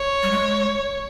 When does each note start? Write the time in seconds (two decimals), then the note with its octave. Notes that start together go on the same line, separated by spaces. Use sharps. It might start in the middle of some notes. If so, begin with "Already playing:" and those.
Already playing: C#5
0.23 G3
0.31 G#3